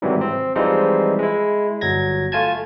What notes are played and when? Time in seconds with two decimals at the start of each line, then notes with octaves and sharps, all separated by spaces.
0.02 G#2 C3 D#3 E3 F#3 G3
0.21 C4
0.56 E3 F3 G3 G#3 C4 D#4
1.19 G#3 E4
1.81 G1 F#3 G#6 A#6
2.32 A3 F4 G#5 A5 G#6